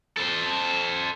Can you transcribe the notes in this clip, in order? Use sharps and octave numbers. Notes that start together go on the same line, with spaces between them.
A4 C5